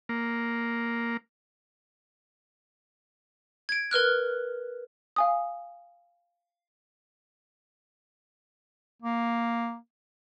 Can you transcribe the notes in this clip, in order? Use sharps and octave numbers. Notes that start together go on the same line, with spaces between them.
A#3
G#6 D7
A#4 B4 F6 F#6
F5 G#5 D#6
A#3